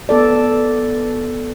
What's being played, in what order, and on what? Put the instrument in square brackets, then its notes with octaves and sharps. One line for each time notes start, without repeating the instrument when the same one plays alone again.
[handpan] B3 A4 D5